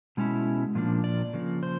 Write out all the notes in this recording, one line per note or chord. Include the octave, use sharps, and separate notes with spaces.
B2 G#3 C#4 E4
A#2 F3 A#3 D4
D5
C#3 F3 A#3
C5